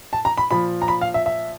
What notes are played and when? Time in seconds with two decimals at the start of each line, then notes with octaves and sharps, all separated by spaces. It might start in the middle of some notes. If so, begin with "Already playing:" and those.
0.13 A5
0.25 A#5
0.38 B5
0.51 A#2 F3 B5
0.82 A#5
0.88 B5
1.01 F5
1.14 E5
1.26 E5